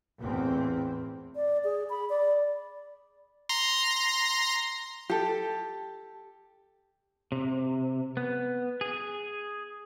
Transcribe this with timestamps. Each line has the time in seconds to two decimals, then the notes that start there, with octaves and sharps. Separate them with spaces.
0.19 A1 E2 A#2 C4
1.36 D5
1.64 G#4
1.90 B5
2.10 D5
3.49 A#5 C6 A#6
5.10 G4 A4
7.32 C3
8.17 B3
8.81 G#4